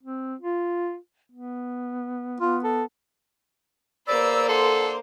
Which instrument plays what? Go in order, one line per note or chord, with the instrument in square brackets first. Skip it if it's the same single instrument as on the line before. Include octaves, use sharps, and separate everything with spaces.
[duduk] C4
F4
B3
[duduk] B3 [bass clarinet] F4
[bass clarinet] A4
[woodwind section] E2 B5 E6 [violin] A#3 C5 [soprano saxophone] D5
[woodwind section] D3 F#5 C6 [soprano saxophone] A4